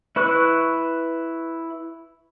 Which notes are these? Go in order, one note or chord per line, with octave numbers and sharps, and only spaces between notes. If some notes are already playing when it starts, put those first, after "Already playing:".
E4 B4 C#6 F#6